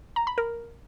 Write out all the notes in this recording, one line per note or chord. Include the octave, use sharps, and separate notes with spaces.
A#5
B5
A#4